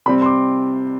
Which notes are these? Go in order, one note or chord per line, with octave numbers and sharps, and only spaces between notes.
C3 G3 C4 B5
C6
D6